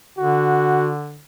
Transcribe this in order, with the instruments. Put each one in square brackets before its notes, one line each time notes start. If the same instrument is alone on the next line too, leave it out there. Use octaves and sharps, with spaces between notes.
[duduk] D3 [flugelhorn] F#4